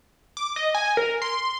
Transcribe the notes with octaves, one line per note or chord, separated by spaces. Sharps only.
D6
D#5
G#5
A#4
C6